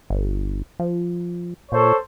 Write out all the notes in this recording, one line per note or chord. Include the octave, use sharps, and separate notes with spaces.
G1
F3
A#2 A4 C5 C#5